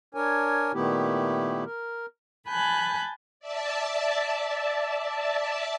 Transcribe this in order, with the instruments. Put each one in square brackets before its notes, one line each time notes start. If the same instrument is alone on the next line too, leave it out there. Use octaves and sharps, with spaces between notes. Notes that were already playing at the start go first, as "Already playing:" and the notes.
[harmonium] D4 A#4 C#5 G#5
A#2 D#3 A3 B3 E4 G4
A#4
[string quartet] G#5 A5 B5 F#6 G6
[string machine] D5 E5 A5